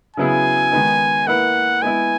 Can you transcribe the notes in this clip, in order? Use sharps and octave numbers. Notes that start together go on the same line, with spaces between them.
C#3 F#3 B3 E4 G#4 G#5
D#3 G#3 B3 D#4
A#3 E4 B4 F#5
G#3 B3 E4 G#5